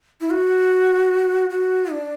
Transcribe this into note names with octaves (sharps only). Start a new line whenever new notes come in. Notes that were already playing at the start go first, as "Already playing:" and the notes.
E4
F#4
F#4
D4